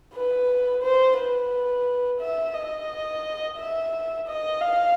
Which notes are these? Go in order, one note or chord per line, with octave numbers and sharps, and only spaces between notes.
B4
C5
B4
E5
D#5
E5
D#5
F5